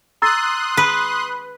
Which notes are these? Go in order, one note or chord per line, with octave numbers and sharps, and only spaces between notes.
A#5 C6 D#6 E6 F#6 A6
B4